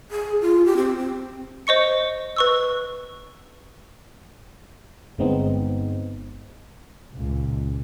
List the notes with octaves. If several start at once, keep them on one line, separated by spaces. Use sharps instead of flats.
G#4
F4
G4
C4
C4
C5 D#5 C#6 C#7
B4 C#6 E6
G1 G#3 B3 C4 D#4
C#2 A#2